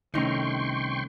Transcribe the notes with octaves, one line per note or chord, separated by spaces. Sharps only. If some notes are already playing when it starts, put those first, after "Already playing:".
C2 D#3 A3 C#4 D#4 G5 C6 C#6